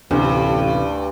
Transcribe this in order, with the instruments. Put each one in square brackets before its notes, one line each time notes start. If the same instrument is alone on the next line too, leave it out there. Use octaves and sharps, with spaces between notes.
[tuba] A1 [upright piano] D2 [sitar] G2 [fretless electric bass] C3 B3